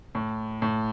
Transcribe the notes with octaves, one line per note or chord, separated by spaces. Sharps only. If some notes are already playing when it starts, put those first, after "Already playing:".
A2
A2